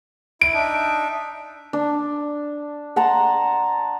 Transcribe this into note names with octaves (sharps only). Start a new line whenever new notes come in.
E4 D7
D4 D#4 E5
D4
F#5 A5 A#5 C6